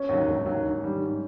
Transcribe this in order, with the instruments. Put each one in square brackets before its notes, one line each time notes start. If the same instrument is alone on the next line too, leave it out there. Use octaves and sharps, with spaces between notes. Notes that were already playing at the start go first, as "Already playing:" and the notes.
Already playing: [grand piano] C#4
[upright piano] D#2 D3 F#3
E1
D#2 D3 F#3
G#2
D#3 G3
G#2